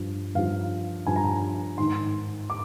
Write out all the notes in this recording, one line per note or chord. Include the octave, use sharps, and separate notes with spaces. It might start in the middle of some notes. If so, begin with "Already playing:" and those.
Already playing: G2 F3
G2 F3 F5
G2 F3 G#5
A#5
G#5
G#2 D#3 C6
D6